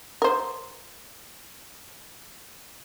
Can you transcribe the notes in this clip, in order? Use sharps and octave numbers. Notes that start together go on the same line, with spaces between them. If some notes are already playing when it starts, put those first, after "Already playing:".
A#4 C5